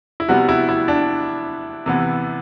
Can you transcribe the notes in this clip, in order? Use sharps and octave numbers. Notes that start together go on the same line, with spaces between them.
E4
C3 G3 B3 F#4
E4
E4
D4
C3 E3 B3